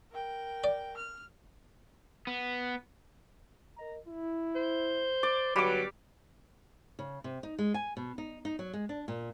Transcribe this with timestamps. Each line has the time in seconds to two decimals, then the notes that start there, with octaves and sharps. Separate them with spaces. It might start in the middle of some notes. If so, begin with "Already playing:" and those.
0.11 A#4 G5
0.64 D5
0.97 F6
2.27 B3
3.77 A#4 D#5 A#5
4.06 E4
4.55 C5
5.23 D5
5.56 G1 F#3 G3 B4 D6
6.99 C#3
7.24 C3
7.43 D#4
7.59 G#3
7.74 G#5
7.97 B2
8.18 D#4
8.45 D#4
8.59 F#3
8.73 G#3
8.89 D4
9.08 A#2